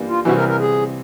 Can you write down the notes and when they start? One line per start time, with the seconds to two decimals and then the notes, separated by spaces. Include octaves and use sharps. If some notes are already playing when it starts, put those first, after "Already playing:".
Already playing: G2 E3 G3 A#3
0.08 F4
0.25 C2 C3 E3 F#4
0.37 A#4
0.49 A#4
0.60 G#4